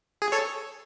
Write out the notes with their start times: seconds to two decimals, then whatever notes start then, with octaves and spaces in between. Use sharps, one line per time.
0.22 G#4
0.32 A4 C#5